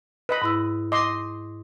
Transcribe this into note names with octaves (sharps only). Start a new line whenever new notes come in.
B4 D#5 B5
G#2 E4 E6
D#5 C6 D6